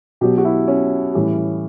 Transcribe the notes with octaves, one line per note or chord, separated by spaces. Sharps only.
B2 F#3 G4
F#4
E4
C#4
A2 E3 G3